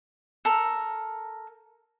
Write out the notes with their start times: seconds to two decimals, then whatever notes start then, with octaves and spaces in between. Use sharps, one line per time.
0.45 A4 A#4